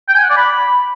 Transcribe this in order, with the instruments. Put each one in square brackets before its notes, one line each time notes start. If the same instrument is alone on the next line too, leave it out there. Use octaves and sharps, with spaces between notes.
[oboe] G5
G#5
F#5
D5
B5